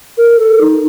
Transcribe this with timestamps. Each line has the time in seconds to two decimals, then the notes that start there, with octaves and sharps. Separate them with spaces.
0.18 A#4
0.39 A4
0.61 D#4